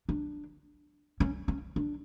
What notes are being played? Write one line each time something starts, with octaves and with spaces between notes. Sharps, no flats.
D4
C#4
C#4
D4